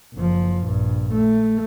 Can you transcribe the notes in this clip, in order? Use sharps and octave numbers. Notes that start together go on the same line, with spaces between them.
F#1 F3
A#1 G2
A3